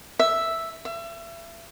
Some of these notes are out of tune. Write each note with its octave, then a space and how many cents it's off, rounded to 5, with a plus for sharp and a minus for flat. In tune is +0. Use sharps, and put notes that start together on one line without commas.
E5 +0
E5 +35